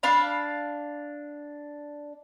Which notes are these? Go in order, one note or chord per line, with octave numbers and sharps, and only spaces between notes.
D4 F5 B5